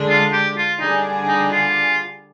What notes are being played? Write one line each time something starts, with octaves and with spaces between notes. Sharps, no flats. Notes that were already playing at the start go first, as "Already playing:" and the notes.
Already playing: D3 G#3 D4
F4
G4
F4
D3 G3 D4 D#4 G#4 D5
D#4
F4